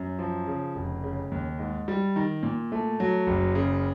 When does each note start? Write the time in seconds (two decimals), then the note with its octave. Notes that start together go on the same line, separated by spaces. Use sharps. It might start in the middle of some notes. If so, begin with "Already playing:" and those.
Already playing: F#2
0.19 F3
0.47 C#3
0.75 F1
1.04 C#3
1.32 D#2
1.59 G#2
1.88 G3
2.16 D#3
2.43 A#2
2.72 A3
3.00 F#3
3.27 F#1
3.55 C#3